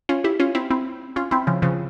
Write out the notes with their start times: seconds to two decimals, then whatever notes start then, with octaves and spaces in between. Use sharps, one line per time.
0.09 C#4 F4
0.24 E4 G4
0.40 C#4 F4
0.55 C4 E4
0.70 C4 E4
1.16 C#4 F4
1.31 C4 E4
1.47 C#3 F3
1.62 C#3 F3